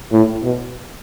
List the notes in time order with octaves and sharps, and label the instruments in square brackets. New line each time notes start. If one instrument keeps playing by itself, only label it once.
[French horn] A2
B2